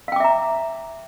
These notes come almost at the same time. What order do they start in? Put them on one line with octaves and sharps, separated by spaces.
F5 G5 D6 E5 A#5